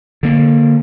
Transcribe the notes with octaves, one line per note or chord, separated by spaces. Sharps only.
D3 A#3